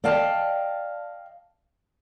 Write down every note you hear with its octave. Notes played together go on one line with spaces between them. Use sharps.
D5 D#5 F5 G5 A5